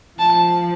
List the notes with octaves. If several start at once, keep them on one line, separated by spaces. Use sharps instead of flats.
F3 A5